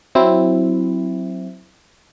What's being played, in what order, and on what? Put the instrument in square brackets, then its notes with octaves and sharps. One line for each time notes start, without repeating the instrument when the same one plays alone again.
[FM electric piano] F#3 C4 E4